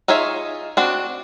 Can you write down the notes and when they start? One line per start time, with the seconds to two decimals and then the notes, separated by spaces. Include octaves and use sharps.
0.08 D#4 F4 G#4 C#5 E5
0.77 C4 D4 F#4